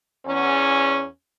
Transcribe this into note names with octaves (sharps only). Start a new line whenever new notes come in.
E2 C#4